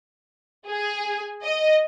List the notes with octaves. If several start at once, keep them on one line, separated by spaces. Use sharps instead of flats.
G#4
D#5